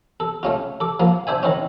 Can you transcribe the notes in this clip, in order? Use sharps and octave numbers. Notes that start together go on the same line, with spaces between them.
A4
A3 C#4 F4
A4 D6
F3 A#3
D4 C5 E5 G#5
D#3 E3 C4 C#4